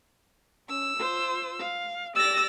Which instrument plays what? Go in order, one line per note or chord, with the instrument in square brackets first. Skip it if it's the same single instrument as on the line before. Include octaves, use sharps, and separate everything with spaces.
[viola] C#4 [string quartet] E6
[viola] F4 C5
F5
[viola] G4 D5 [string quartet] E6 A6 A#6